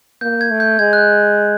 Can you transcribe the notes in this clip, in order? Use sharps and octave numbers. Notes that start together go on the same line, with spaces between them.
A#3 G6
G#6
A3
G6
G#3 G#6
F#6
G6